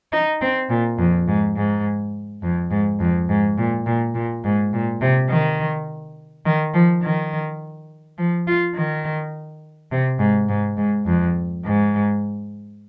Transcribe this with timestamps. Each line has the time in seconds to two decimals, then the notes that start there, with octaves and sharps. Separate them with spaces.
0.13 D#4
0.41 C4
0.70 A#2
0.98 F2
1.28 G#2
1.56 G#2
2.42 F2
2.71 G#2
3.00 F2
3.29 G#2
3.58 A#2
3.86 A#2
4.14 A#2
4.44 G#2
4.73 A#2
5.01 C3
5.30 D#3
6.45 D#3
6.74 F3
7.03 D#3
8.18 F3
8.47 F4
8.75 D#3
9.92 C3
10.19 G#2
10.49 G#2
10.77 G#2
11.06 F2
11.64 G#2